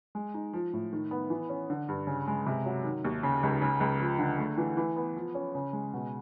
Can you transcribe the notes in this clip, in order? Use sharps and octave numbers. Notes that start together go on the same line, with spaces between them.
G#3
D#4
F3
A2
D#3
B3
E3
C#4
D3
G2
C#3
G#3
C3
F#3
D#3
D#2
C#3
C#2
C#3
C#2
F3
D3
A3
E3
E3
B3
F3
C#4
C#3
G#3
B2